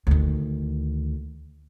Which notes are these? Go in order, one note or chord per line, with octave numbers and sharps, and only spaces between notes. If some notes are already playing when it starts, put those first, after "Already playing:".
D2 D#3